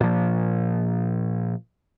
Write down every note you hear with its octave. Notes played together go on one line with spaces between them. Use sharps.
A#2 F3